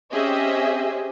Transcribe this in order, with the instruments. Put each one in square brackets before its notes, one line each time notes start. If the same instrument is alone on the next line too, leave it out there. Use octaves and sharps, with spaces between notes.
[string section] C4 C#4 G4 G#4 D#5 E5